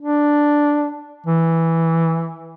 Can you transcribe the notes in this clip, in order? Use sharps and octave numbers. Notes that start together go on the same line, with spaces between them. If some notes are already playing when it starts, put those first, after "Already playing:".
D4
E3